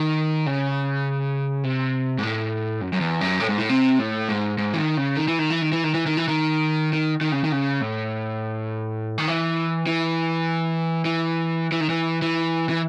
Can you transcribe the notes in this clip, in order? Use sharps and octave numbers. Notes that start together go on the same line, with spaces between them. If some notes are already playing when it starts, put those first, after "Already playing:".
Already playing: D#3
C#3
C3
G#2
A2
F#2
F#2
E2
F#2
A2
G#2
A2
C3
A2
G#2
G#2
E3
D#3
C#3
D#3
E3
D#3
E3
D#3
E3
D#3
E3
D#3
E3
D#3
D#3
D#3
C#3
D#3
C#3
A2
D#3
E3
E3
E3
E3
D#3
E3
E3
E3